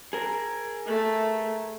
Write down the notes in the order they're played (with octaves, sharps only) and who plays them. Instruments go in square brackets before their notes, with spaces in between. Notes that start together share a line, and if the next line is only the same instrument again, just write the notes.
[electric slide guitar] G#4 A#4
[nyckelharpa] A3